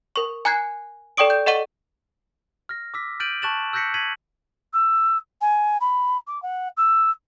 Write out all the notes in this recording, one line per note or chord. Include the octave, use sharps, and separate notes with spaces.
A#4 C#6
G#5 A#5 F#6 G#6 C7
A4 D5 G5 C#6 D#6 D7
G6
A4 D#5 F#5 C#6 D#7 G7
F6 A#6
D6 E6 B6
F6 G6 A6 D7 D#7 F#7
A5 C#6 F#6 A6 E7 F#7
E6 F#6 G6 A#6 B6 C#7
G#6 B6 D#7 F#7
E6
G#5
B5
D6
F#5
E6